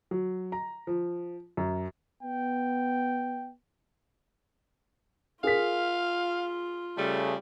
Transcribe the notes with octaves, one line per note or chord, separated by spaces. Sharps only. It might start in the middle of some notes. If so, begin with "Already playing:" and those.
F#3
A#5
F3
F#2
B3 G5
F4 G#4 A#4 F5 B6
C#3 G3 A3